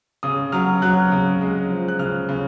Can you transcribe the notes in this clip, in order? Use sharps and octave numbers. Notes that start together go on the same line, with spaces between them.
C#3 D#6
F#3 F6
F#3 F#6
C#3
G#3
F3
F#6
C#3 F6
C#3